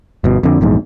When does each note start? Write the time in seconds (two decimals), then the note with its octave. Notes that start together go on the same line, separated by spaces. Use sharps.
0.24 G1 B2
0.43 F2 D3
0.61 A#1 E2 G#2